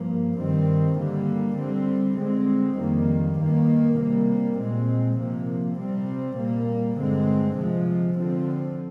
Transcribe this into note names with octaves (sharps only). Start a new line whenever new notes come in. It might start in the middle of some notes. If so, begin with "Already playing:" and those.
Already playing: G2 F3 A#3
G2 D#3 G3 C4
D3 G3 A#3
D3 G3 C4
D3 G#3 C4
F2 D#3 G3 A#3
G2 D#3 A#3
C3 G3 A#3
A#2 G#3 C4
C3 F3 A#3
C3 G3 C4
A#2 G3 A#3
G2 D3 G#3 C4
C3 F3 G#3
D3 F3 C4